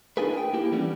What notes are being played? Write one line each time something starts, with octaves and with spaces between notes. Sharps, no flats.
D4 D#4 F4 G#4 A#4 B4
G5 G#5
A#3 E4 G4
E3 G3 A3 B3 C#4 D4